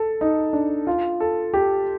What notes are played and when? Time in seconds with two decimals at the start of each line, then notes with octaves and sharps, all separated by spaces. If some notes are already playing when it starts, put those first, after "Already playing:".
Already playing: A4
0.21 D#4
0.53 D4
0.87 F4
1.20 A4
1.54 G4